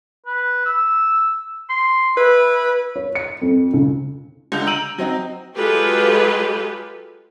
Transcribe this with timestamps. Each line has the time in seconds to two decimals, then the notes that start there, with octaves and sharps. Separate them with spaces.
0.26 B4
0.66 E6
1.69 C6
2.17 E4 B4
2.96 C#5
3.15 C#7
3.42 F2
3.74 C#2
4.52 C#2 D3 G6 F7
4.66 A#5 E6 D7 D#7 F#7
4.98 F#3 C4 D#4
5.56 F#3 G#3 F4 G4 A4 B4